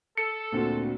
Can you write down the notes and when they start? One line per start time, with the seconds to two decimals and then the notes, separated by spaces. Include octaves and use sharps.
0.18 A4 C#7
0.52 D2 A#2 C4 F#4